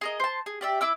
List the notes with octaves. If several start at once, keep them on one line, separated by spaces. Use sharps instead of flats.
G#4 A#4 D#5
C5 A5
G#4
G4 D5 E5
E4 D6 E6